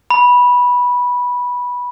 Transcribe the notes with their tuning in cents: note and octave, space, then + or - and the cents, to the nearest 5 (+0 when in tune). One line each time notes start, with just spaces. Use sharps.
B5 -10